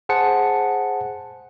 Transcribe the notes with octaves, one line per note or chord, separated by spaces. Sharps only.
G#4 C5 F#5 A5 C#7